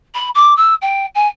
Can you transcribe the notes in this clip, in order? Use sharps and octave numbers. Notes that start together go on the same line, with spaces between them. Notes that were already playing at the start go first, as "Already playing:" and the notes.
B5
D6
E6
G5
G#5